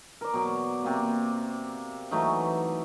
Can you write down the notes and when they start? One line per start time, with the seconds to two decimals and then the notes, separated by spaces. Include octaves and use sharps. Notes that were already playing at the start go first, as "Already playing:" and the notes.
0.21 A#4 D5
0.34 B2 F#3
0.84 C3 A#3
2.11 E3 F#3 A3 D#4